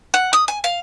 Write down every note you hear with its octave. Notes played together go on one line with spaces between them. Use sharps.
F#5
D#6
G#5
F5